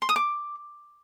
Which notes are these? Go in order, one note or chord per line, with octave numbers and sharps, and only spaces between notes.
C6
D#6
D6